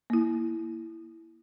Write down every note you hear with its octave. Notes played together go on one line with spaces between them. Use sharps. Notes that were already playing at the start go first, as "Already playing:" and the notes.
A#3 E4